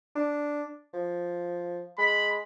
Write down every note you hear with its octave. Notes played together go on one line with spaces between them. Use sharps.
D4
F3
G#3 B5